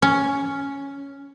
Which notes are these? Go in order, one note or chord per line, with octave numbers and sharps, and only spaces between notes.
C#4